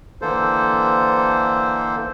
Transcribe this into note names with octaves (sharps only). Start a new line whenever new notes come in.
D3 E3 A#3 A4 C5